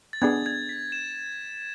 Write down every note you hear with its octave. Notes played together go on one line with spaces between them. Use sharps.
A6
B3 D4 G#4 G#6
G#6
B6
E7